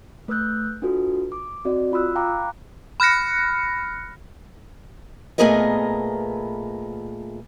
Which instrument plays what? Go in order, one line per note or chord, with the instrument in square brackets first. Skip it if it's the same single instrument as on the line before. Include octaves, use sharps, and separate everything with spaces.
[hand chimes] A3 B4 D#6 E6 F#6 G6
D4 F4 F#4 A4 B4
D6
C4 F#4 D5 D#5
F4 B5 C6 D#6 E6 F#6
F5 G5 A#5 B5 D6 F#6
[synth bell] B5 F6 F#6 A#6 C#7
[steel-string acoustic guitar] A#2 A3 B3 G#4 A#4 D#5